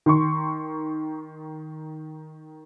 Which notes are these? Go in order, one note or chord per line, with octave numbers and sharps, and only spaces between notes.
D#3 C6 C#6